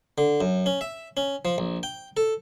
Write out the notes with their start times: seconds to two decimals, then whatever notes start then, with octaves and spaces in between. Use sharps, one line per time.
0.18 D3
0.41 F#2
0.66 C#4
0.81 E5
1.17 C#4
1.45 F3
1.58 A#1
1.83 G5
2.17 A4